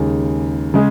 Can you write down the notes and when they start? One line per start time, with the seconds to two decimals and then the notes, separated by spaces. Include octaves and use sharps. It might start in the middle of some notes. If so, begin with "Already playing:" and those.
Already playing: D#2 C#3 G#3
0.74 C#3 G#3